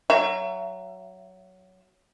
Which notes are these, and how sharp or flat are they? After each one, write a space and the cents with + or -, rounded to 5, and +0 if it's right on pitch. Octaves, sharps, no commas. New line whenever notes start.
F#3 +10 E5 +30